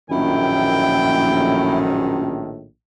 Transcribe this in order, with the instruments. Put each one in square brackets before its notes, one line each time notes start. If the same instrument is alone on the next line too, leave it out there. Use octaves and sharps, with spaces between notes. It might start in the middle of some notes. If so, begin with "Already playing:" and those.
[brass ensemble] A#1 A2 D#3 [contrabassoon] F#2 [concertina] E4 [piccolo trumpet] G5